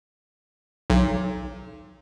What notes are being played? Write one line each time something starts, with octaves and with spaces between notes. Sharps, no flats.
B1